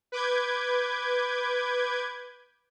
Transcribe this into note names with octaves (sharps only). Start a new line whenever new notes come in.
B4 D6 G6 G#6